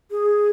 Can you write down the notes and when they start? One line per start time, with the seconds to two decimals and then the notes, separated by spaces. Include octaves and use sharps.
0.11 G#4